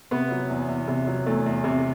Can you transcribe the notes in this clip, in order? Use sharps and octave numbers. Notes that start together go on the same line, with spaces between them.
C3 B3
F#3
E2
E2
C3
F#3
E2 A3
E2
C3